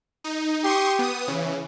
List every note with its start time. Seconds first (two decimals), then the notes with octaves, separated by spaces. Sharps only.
0.24 D#4
0.64 G4 C6 C#6 D#6
0.99 B3 D#6
1.27 C#3 E3 C#4